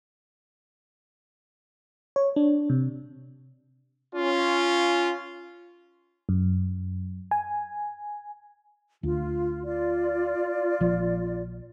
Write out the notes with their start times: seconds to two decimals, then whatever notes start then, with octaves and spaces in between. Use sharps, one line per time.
2.16 C#5
2.36 D4
2.70 C3
4.15 C#4 F4
6.29 F#2
7.31 G#5
9.03 D2 F4
9.65 F4 D5
10.80 A#1 F3